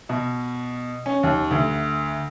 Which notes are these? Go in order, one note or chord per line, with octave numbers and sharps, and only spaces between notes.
B2
C#4
D#2
D2